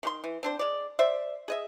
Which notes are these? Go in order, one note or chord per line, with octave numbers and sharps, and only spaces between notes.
D#3 G4 C6
E3
C4 D4 C5
G#3 D5
C5 D5 E5
G#4 D#5 E5